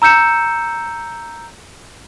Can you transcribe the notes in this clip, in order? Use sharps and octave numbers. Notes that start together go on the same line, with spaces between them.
A#5 E6 G6 C#7 E7